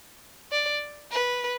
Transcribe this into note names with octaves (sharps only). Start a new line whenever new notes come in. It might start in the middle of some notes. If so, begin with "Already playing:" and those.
D5
B4